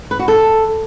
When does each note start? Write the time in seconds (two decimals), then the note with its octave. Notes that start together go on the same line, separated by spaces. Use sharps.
0.11 B4
0.19 F#4
0.28 A4